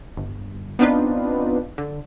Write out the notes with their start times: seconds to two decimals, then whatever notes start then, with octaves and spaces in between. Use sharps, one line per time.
0.17 G1
0.79 B3 C4 D4 D#4 F4 B4
1.78 D3